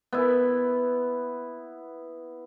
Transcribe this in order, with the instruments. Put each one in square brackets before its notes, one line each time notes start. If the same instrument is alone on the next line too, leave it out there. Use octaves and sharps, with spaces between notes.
[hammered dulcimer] B3 E4